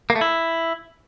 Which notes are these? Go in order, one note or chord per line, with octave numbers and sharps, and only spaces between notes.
A#3
A3
E4